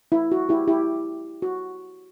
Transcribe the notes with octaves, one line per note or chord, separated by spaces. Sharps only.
E4
F#4
E4 G4
E4 G4
F#4